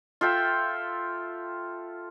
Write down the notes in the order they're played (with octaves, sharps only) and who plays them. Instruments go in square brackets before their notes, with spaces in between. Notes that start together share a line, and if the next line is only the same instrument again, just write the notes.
[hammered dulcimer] F4 A4 E5 G5